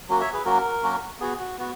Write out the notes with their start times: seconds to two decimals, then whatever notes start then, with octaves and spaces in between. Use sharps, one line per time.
0.09 F#3 A#3 C#4 F#4
0.20 C#5 E5
0.33 G#4 B4
0.45 F#3 A#3 C#4 F#4 A#4
0.83 F#3 A#3 C#4 F#4
1.20 B3 F#4 G#4
1.40 F#4
1.58 B3 F#4